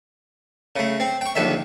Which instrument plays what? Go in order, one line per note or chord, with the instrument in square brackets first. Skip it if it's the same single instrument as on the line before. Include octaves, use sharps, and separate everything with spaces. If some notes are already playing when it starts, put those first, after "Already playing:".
[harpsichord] C#3 A3
C4
G5 C#6
A#1 D#2 D3 E5